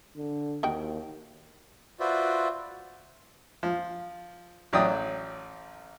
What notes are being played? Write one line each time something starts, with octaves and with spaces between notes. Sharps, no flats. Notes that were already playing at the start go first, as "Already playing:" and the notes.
D3
D#2 D#4 F#4 G5
F4 F#4 B4 C5 D5 E5
F3
A1 F#3 D5 G5 D#6